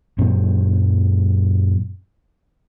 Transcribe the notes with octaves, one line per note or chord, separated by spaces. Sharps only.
F#2 A#2 F#3 C4